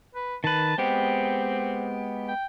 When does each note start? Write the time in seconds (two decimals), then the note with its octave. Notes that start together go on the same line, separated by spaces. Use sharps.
0.15 B4
0.44 D#3 B4 A5
0.78 G#3 B3 C4 G4
2.28 G5